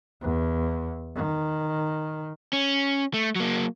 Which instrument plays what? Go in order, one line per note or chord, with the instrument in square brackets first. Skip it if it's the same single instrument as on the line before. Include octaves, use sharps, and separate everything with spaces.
[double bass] E2
D#3
[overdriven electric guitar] C#4
A3
F#3 A#3